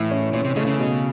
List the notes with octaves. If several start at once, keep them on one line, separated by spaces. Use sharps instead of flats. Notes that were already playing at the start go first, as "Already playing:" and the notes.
Already playing: A2 E3 E4
C#4
A#2 C#4
C3
C#3 A3
C#3
B2